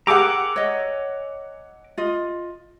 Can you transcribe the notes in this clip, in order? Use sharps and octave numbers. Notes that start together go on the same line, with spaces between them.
G4 G#4 A#4 F#5 G#5 A#5 D6 E6
C#5 D#5
F4 D#5